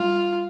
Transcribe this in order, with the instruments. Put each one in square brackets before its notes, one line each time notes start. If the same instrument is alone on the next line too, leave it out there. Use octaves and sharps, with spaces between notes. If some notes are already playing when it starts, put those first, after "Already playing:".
Already playing: [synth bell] G3 [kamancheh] F4